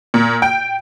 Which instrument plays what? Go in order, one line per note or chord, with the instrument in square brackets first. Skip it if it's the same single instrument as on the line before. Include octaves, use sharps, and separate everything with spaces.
[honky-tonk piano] A#2
G5